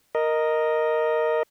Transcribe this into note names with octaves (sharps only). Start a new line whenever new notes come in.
A#4 D#5